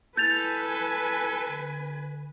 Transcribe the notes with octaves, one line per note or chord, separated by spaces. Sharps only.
E4 A4 B4 G#5 G6 A6 F7
D3